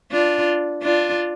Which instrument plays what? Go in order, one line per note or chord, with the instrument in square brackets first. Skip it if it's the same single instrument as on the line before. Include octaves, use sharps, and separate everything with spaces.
[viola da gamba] D4 F4
D4 F4